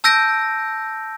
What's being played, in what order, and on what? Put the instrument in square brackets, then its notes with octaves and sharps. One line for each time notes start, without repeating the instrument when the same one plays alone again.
[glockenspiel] A5 E6 G6 A#6 D7